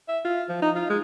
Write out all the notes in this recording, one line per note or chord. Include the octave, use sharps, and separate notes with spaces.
E5
F4
F3
D#4
F4
G#3